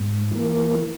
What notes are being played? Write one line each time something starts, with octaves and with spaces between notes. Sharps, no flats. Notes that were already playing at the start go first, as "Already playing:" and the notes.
Already playing: G#2
E3 A#3